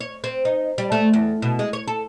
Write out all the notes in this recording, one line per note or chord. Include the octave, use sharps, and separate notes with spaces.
C#5
C4
D#4
G3
A3
E2
B2
G#3
C#5
A4